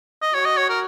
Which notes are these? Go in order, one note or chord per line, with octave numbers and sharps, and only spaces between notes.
D#5
F#4 C#5
D#5
C#5
A#4